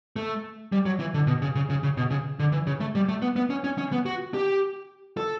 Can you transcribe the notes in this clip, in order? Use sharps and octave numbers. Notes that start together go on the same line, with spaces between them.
A3
G3
F#3
E3
D3
B2
C#3
C#3
C#3
C#3
B2
C#3
D3
E3
C#3
A3
G3
A3
B3
B3
C#4
C#4
C#4
B3
F#4
G4
A4